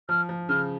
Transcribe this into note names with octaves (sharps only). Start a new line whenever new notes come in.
F3 F6
F3
C#3 F6